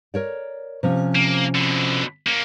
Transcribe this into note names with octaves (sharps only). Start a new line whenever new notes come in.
A#4 C#5 D5
C3 F3 C#4
A#3
B2 D3
A#3 C#4